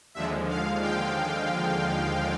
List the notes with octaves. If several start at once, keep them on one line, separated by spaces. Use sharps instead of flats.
D#2 D3 F3 G#3 E5
F5
G5